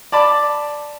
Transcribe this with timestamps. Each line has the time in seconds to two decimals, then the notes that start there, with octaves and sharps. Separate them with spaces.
0.12 D5 A5 B5